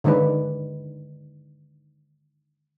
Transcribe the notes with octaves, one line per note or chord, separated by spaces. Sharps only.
D3 D#3 G#3 D4 B4